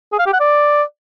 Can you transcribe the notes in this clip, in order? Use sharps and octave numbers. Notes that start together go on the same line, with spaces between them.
G#4
F5
G4
F#5
D5